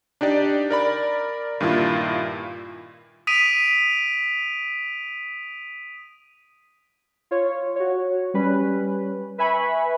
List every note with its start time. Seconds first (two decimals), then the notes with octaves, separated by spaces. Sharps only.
0.21 D4 D#4 G4 D5
0.70 A#4 D5 B5
1.60 G2 A#2 D#3 E4 F4
3.27 D#6 B6 D7 D#7 F7
7.31 F4 C#5
7.76 F#4 C#5
8.34 G3 C#4 B4
9.38 B4 E5 G#5 B5 C#6